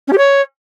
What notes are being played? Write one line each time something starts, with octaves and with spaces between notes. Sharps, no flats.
C#4
G4
C#5